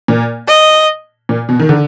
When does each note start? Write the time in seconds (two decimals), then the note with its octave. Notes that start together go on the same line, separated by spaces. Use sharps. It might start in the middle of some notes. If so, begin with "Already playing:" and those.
0.08 A#2
0.48 D#5
1.29 A#2
1.49 B2
1.59 D#3
1.69 D3